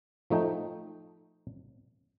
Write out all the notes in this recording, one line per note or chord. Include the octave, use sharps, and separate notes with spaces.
F3 A3 D#4 G5